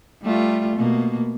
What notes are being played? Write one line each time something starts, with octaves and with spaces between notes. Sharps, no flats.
G3 A3 F4
B2 A#3